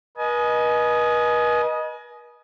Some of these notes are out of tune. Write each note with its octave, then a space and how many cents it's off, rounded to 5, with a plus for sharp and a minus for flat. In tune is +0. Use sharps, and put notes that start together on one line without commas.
B4 -40 D#5 +0 G#5 +30